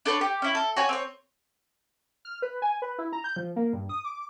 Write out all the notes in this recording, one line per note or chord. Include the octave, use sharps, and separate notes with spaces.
D4 A4 B4 C#5
G4
C#4 E4
A4
F#4 C#5 G#5
C4 C#5
F6
B4
G#5
B4
E4
A#5
G6
F3
A#3
G2
D#6
D6